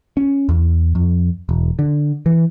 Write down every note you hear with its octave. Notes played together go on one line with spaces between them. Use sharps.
C#4
E2
F2
E1
D3
E3